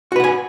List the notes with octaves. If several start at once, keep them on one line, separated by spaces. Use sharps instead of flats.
F#4 B4 F#5 G#5